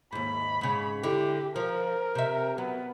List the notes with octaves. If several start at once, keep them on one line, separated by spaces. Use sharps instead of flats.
D#2 G#2 B5
G#2 C#3
D3 E4 G4
F3 A#4
C3 E5
F#3 B3